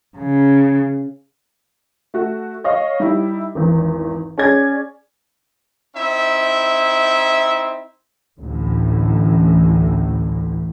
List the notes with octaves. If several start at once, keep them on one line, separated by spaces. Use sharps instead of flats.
C#3
A3 F#4
C#5 D#5 F5
G3 D#4 E4
G#1 E2
C#4 G#4 D5 G#6
C4 D#4 E4 E5
A1 D2 A2